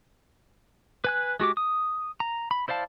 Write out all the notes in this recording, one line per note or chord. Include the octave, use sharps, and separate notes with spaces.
B4 G#5 F#6
G#3 F#4 G4 D6
D#6
A#5
B5
E4 C5 D5 F5 A5